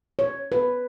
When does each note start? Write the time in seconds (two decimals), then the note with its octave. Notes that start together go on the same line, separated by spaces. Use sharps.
0.19 C#5
0.52 B4